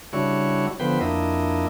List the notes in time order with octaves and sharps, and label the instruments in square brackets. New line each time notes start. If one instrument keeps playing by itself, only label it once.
[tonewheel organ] C#3 G3 D4 E4 F#4 C#5
D3 F3 B3 B4 C5 G5
F2 A#3 D4 E4 D#5